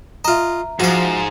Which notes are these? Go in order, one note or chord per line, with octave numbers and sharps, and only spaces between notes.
F4 D#5 E5 A#5
G#2 F3 F#4 F5